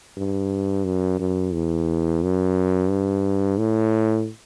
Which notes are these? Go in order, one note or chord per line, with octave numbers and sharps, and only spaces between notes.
G2
F#2
F#2
E2
F#2
G2
A2